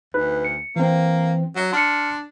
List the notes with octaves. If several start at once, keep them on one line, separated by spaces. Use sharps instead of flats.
D2 D#4 B4
C#7
E3 A#3 C4
F#3
D4 C6 F6 C#7